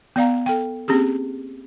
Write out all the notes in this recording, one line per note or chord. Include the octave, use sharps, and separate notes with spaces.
B3 D5 F5 A#5
A4 G5
A#3 C4 C#4 G4 G#4